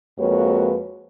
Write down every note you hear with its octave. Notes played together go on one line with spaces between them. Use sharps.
F2 G#3 A#3 F#4 B4 C#5